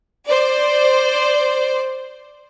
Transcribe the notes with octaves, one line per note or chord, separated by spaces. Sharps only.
C5 D5